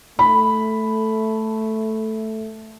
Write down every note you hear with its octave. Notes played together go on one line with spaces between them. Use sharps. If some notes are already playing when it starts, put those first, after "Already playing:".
A3 B5